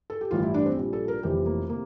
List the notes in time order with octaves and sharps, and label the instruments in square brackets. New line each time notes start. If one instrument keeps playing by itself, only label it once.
[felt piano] A4
G4
A1 G2 E3 G3 F4
E4
D4
C4
A#1 A#2 G3
A4
A#4
F1 F2 E3 G3 G4
A#3
C3 A#3